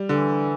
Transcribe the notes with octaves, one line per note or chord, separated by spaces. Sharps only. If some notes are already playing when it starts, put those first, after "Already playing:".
Already playing: G3
D3 E3